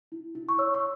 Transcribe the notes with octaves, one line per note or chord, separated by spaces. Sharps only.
E4
E4
C#6
C#5 E6
C#6